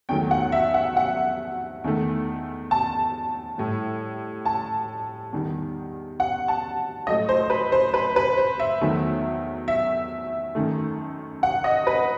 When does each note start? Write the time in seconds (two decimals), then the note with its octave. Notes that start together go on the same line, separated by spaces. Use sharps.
0.09 E2 D#3 F#3 A3 G5
0.31 F#5
0.52 E5
0.74 F#5
0.97 F#5
1.84 E2 D#3 A3
2.71 A5
3.58 A2 G3
4.45 A5
5.32 E2 D#3 G3
6.20 F#5
6.48 A5
7.07 A2 F#3 A3 D#5
7.29 C5
7.50 B4
7.72 C5
7.94 B4
8.16 B4
8.38 C5
8.60 E5
8.81 E2 D#3 F#3 A3
9.68 E5
10.55 F#2 D#3 A3
11.43 F#5
11.64 D#5
11.87 B4